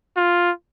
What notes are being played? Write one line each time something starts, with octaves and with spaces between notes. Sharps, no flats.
F4